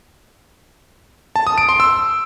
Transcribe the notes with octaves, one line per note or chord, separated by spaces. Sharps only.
A5
D#6
D7
C6
E6